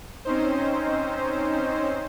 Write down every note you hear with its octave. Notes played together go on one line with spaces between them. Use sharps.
C4 C#4 D#4 C5